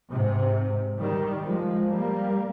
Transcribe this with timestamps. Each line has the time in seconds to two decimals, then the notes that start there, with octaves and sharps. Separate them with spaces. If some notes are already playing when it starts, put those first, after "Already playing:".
0.13 G#2 C3
1.01 D#3 G3
1.45 F3 G#3
1.89 G3 A#3